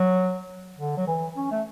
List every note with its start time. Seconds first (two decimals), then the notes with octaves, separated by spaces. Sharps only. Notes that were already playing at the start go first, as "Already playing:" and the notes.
Already playing: F#3
0.78 D3
0.97 F#3
1.07 E3
1.37 C#4
1.51 A3